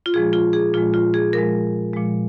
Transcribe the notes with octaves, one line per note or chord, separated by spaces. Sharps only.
F4
A#2 F3 G#3 G#4
F4
G#4
A#2 F3 G#3 F4
F4
G#4
A#2 F3 G#3 A#4
A#2 F3 G#3